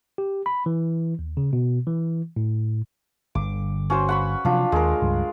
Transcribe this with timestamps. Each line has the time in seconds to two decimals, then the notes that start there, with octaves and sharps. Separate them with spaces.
0.18 G4
0.46 B5
0.66 E3
1.19 D#2
1.37 C#3
1.53 B2
1.87 E3
2.36 A2
3.35 G1 D3 D6
3.90 C#4 F#4 C5
4.09 F#5 B5 C#6
4.45 C3 F3 F#3 D4 F4
4.72 D#2 G#3 A#4
5.02 C#2 G2